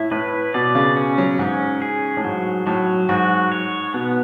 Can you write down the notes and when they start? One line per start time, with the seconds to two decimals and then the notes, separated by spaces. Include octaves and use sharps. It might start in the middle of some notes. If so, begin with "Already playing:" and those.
Already playing: A2 E4
0.11 A2 B4
0.54 B2 D5
0.75 C#3
0.96 C#4
1.18 F#3
1.39 G#2 C#4
1.82 G#4
2.17 A2
2.24 G#2 F#3
2.67 A2 F#3
3.09 G#2 F#4
3.52 C#5
3.94 B2 B3